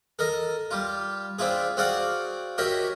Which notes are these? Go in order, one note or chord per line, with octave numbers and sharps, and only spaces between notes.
A4 A#4 D#5
G3 F4
C4 D4 E4 F4 G#4
C4 F#4 G#4 D5 F5 F#5
F#4 G4 A#4 C#5 D#5 E5